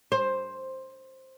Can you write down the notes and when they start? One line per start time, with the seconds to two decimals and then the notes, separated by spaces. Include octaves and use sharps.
0.12 C5